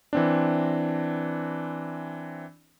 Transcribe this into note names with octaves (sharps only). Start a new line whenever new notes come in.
E3 C4 D4